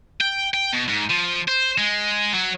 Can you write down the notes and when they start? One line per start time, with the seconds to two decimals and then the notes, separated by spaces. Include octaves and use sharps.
0.21 G5
0.54 G5
0.73 B2
0.88 G#2
1.10 F3
1.48 C5
1.78 G#3
2.34 F#3